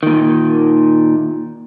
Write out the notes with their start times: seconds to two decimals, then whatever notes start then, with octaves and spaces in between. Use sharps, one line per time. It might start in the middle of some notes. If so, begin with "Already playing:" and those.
0.03 A#2 D#3